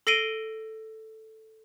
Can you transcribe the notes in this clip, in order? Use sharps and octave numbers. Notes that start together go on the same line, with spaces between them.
A4 A#6 C7 D7 D#7 G7